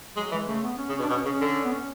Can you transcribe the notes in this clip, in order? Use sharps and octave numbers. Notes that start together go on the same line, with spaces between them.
F#3 G#3
E3 G#3
C#3 A3
B3
C#4
C#3
B2 C#4
D4
B2 C#4
C#3 C#4
D3
B3
C#4